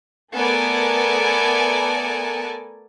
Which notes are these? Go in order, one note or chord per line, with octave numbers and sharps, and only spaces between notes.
A3 B3 A4 A#4 D5 G#5